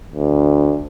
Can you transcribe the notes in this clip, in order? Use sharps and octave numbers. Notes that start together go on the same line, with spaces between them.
D2